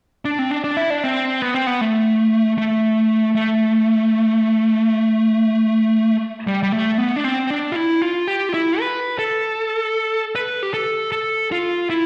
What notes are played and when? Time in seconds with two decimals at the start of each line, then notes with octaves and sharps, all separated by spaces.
0.25 D4
0.39 C4
0.51 D4
0.64 D4
0.77 E4
0.90 D4
1.04 C4
1.42 B3
1.54 C4
1.67 B3
1.81 A3
2.58 A3
3.35 A3
6.47 G3
6.63 G3
6.72 A3
6.98 B3
7.16 D4
7.24 C4
7.50 D4
7.72 F4
7.76 E4
8.02 F4
8.28 G4
8.49 F4
8.54 E4
8.80 B4
9.19 A4
10.36 B4
10.63 G4
10.74 A4
11.12 A4
11.52 F4
11.90 E4